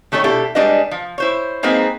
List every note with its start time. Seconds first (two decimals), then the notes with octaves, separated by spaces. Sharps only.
0.12 D#3 A3 D4 A4 C#5
0.24 B2 D4 E4 G4 A4
0.55 G3 G#3 D4 B4 D#5
0.91 F3
1.18 E4 C5 C#5
1.63 G#3 A#3 C4 D#4 G#4 B4